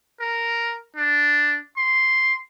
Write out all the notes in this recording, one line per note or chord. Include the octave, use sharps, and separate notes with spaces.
A#4
D4
C6